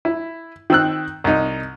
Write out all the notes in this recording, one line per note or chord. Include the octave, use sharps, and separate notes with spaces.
E4
D#3 C4 E6 F#6
C2 D#4